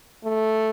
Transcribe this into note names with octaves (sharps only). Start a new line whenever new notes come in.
A3